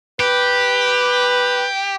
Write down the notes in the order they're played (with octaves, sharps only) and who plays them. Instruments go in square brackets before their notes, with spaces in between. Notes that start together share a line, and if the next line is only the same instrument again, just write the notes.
[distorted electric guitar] G4 [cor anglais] B4